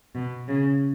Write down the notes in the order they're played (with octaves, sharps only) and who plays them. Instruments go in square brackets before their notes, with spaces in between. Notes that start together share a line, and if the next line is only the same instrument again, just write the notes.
[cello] B2
C#3